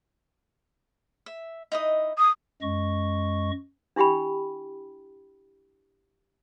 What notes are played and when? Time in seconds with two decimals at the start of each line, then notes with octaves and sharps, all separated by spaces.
1.26 E5
1.72 D#4 E4 D#5
2.18 D#6
2.62 F#2 G#3 D#5 C#6
3.96 D4 E4 G4 G5 B5